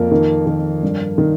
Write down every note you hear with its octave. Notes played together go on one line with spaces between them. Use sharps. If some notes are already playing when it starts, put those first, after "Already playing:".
Already playing: F2 A#3
D#3
D#3
G2
D#3